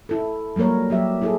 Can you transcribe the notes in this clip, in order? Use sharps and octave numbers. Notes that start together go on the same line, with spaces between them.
E4 A4
F#3 G3 A#3 A#4 C#5
F#3 G4 E5
E4 G#4 A4